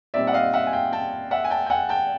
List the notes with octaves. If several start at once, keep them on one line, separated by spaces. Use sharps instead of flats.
A#2 G3 C4 D#4 D5 E5
F#5
D#5 F5
E5 F#5
G#5
F5 G5
G5 A5
E5 F#5
G#5
G5 A5
G5
F#5 G#5
G5 A5